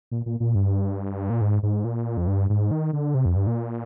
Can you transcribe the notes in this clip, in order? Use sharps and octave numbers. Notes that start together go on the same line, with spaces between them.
A#2
A#2
A#2
G2
A#2
G#2
G#2
A#2
F2
G2
G#2
D#3
D3
C3
F2
G2
A#2